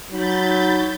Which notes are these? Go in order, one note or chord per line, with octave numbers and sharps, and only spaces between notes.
F#3 D#4 B5 G6 A6